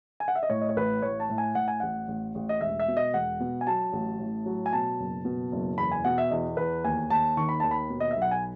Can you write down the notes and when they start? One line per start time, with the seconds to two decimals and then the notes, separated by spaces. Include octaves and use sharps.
0.20 G#5
0.28 F#5
0.35 E5
0.43 D#5
0.49 A2 C#5
0.61 D#5
0.69 C#5
0.76 A1 B4
1.02 A2 C#5
1.20 A5
1.30 A2
1.38 G#5
1.55 A2 F#5
1.68 G#5
1.80 A1 F#5
2.08 A1
2.35 A1
2.49 D#5
2.61 E1 E5
2.80 E5
2.88 B2
2.97 D#5
3.14 E1 F#5
3.40 B2
3.61 G#5
3.67 F#3 A5
3.93 A1
4.19 A2
4.46 F#3
4.66 G#5
4.73 B2 A5
4.99 F#1
5.25 B2
5.52 F#1
5.78 E2 B5
5.91 G#5
6.05 B2 F#5
6.18 E5
6.30 E2 D#5
6.57 E2 B4
6.84 D#2 G#5
7.10 D#2 A5
7.37 D#3 C#6
7.49 B5
7.60 D#2 A5
7.71 B5
7.90 B2
8.00 D#5
8.11 E5
8.16 B1
8.22 F#5
8.31 G#5